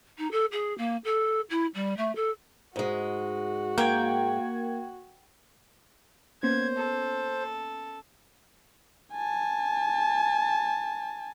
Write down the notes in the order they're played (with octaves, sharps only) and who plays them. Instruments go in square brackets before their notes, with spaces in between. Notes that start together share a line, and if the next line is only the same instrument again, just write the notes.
[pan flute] D#4
A4
G#4
A#3
A4
E4
G3
A3
A4
[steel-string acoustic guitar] G#2 G#3 [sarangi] F#4
[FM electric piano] A#3 G#6 [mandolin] G5
[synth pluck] A#3 B3 C#4 [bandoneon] C5 [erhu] G#6
[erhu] A4
[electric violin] G#5 A5